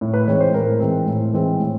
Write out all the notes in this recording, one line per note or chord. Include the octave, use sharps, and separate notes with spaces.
A2
B4
E3 G#3 C4 C#5
C5
A2 A#4
E3 G#3 C4
A2
E3 G#3 C4
A2